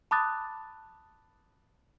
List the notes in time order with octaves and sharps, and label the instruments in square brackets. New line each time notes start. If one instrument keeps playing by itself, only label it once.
[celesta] A5 B5 D6 D#6 F#6 A6